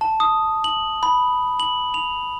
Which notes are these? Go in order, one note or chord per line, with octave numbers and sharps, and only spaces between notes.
A5
D#6
F#7
B5
F#7
F7